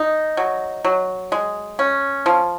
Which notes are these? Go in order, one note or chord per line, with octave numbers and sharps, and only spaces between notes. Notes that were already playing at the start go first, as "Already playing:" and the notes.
Already playing: D#4
F#3
F#3
G#3
C#4
F3